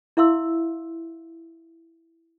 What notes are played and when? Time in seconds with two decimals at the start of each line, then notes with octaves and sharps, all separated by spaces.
0.17 E4 E5 F5 C6 E6